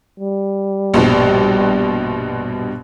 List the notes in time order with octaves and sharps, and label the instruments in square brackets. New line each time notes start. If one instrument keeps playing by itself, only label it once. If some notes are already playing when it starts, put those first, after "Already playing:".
[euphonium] G3
[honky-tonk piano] A#1 G2 B2